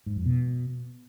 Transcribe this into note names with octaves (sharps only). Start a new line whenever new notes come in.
G#2
F2
B2